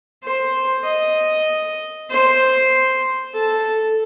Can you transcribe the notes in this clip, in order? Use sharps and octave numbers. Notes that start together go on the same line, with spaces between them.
C5
D#5
C5
A4